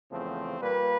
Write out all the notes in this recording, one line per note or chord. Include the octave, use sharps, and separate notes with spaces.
E2 C#3 F3 A3 C4
A#2 G3 A#3 B4